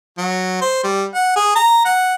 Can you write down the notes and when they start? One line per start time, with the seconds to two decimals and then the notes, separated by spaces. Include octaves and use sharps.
0.18 F#3
0.61 C5
0.84 G3
1.14 F#5
1.36 G#4
1.56 A#5
1.85 F#5